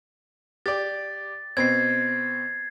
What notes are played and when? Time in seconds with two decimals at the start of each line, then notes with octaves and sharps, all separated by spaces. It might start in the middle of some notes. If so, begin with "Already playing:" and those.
0.66 G4 D5 A6
1.57 B2 C4 G#6 C7